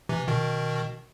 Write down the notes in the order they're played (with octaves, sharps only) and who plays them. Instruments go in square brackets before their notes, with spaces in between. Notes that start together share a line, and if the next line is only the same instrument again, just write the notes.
[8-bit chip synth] C3 E3
B2 D#3